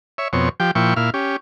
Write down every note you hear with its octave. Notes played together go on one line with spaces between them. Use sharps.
C#5 E5
F2 B2 C4 C#5
F3 G4 G5
A#2 F3 E4 G5 C#6
A#2 E4 F5
C#4 G4